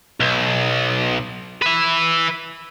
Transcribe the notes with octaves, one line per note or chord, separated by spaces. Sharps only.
B1
B4 E5